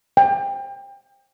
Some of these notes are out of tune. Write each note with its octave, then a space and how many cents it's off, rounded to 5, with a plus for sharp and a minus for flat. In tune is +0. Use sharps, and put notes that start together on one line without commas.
G5 +25